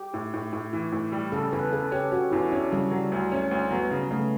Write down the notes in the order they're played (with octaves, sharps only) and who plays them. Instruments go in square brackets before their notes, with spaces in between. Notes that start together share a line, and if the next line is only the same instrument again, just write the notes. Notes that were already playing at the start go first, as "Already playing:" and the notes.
Already playing: [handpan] G4
[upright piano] A2
A2
A2
E3
A2
G3
[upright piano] C#3 [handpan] A4
[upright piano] E2 [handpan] B4
[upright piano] C#3 [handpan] A4
[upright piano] C#4 [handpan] G4
[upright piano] C#4 [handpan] F#4
[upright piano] E2 [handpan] E4
[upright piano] C#4 [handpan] D4
[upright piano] C#3 [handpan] G3
[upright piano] F#3
D2
C#4
D2
[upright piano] F#3 [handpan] B3
[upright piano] C#3
[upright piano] C#3 [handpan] A3